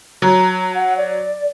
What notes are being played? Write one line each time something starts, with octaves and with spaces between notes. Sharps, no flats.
F#3 A#5
F#5
D5